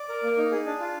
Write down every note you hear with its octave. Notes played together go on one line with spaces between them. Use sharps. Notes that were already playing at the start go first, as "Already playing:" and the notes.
Already playing: D5
A#4
A#3
D#4
G#4
D4
F4